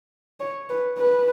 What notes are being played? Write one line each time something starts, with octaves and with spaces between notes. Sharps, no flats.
C#5
B4
B4